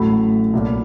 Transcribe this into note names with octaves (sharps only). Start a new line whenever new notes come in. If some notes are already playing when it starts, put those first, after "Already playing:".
Already playing: A1 A2 F#3 A3 B5
B1 A#2 F#3